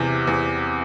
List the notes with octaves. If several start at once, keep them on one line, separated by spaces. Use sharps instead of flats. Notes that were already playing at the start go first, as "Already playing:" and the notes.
Already playing: E2 C3
E2